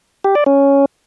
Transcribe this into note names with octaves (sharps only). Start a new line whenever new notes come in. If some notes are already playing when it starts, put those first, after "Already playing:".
G4
D5
C#4